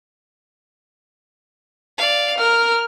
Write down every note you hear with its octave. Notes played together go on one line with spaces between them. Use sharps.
D5 F5
A#4 F6